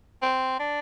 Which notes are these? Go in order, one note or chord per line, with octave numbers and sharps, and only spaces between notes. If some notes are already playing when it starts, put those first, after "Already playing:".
C4
D4